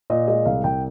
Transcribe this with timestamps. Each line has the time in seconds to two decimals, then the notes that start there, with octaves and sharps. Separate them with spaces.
0.10 A#2 D#5
0.28 G#3 D#5
0.45 C2 F5
0.64 C2 G5